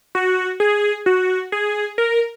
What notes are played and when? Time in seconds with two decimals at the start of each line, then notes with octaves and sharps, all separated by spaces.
0.15 F#4
0.60 G#4
1.06 F#4
1.52 G#4
1.98 A#4